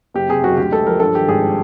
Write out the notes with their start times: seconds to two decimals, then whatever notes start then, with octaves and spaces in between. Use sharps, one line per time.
0.14 F#1 G4
0.29 C3 G#4
0.43 F#1 F#4
0.57 D2 G4
0.72 G#3 A4
0.86 F3 A#4
1.00 G2 A4
1.15 D#3 G4
1.28 G#1 G#4